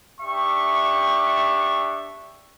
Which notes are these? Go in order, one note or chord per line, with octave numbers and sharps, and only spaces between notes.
D4 G4 E5 C#6